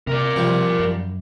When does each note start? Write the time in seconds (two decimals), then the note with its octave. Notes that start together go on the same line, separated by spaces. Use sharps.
0.07 C3 A#4 D5
0.36 C3 F3 G3
0.80 F#2